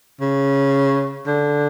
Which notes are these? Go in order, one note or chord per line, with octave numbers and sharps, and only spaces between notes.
C#3
D3